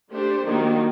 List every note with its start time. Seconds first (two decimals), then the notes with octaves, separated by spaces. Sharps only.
0.12 A3 D4 G4 C5
0.45 D#3 F#3 A#3 D4